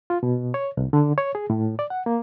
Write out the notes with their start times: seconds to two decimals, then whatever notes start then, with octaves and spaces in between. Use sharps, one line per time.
0.10 F4
0.23 B2
0.54 C#5
0.77 C2
0.93 D3
1.18 C#5
1.35 G#4
1.50 A2
1.79 D5
1.90 F#5
2.06 A#3